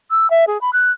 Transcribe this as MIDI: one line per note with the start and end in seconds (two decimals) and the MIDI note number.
0.11 0.30 88
0.30 0.45 76
0.47 0.60 68
0.61 0.70 83
0.73 0.91 90